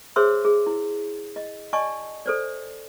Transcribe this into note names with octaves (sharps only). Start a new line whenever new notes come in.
G#4 C5 C#5 E5 C6 E6
G#4
E4
D#5
D5 D#5 G#5 A5 C#6
A4 C5 D5